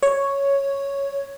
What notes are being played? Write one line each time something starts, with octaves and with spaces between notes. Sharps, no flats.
C#5